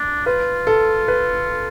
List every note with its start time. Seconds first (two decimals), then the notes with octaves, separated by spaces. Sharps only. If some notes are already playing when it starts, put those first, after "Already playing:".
Already playing: D4
0.26 F4 B4
0.67 A4
1.08 B4